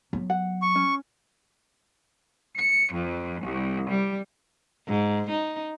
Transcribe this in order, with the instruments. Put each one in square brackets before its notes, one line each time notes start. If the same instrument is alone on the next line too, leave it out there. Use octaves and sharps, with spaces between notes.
[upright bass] F#3 B3
[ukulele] F#5
[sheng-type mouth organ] C#6
[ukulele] C#4
[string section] C#7
F2
C2
G3
[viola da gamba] G#2
D#4